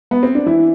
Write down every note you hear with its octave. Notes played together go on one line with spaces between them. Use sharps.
B3
C4
D4
E3 E4